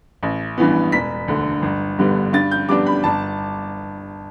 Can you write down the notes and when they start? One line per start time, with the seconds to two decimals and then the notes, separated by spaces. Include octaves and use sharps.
0.23 A1
0.58 G2 E3 B3
0.92 E1 B6
1.28 D2 D3
1.62 G1
1.98 G2 D3 G3 B3
2.33 G2 A6
2.51 G6
2.69 G3 B3 D4 D6
2.86 B5
3.04 G1 A5